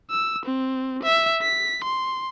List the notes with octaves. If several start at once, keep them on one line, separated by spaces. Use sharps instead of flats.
E6
C4
E5
B6
C6